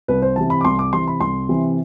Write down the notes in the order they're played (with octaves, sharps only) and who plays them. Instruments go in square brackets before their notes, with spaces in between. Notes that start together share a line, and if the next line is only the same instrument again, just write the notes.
[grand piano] C2 B4
C5
C3 E3 A5
B5
D6
C2 C6
D6
C3 E3 C6
B5
C2 C6
C3 E3